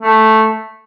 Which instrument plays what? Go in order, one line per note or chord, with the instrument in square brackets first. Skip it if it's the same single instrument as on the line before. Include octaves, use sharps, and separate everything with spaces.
[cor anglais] A3